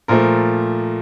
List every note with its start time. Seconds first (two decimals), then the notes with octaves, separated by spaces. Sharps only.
0.08 A#2 F3 A3 A#4